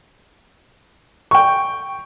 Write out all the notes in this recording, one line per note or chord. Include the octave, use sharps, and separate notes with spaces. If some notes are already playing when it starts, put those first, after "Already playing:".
G5 C#6